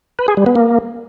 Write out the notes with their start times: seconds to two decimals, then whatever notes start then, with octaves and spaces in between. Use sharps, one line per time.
0.19 B4
0.28 G#4
0.37 G3
0.46 B3
0.56 A#3